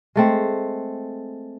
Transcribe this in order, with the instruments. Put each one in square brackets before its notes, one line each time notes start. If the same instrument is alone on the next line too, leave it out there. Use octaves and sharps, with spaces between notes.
[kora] G#3 A3 C4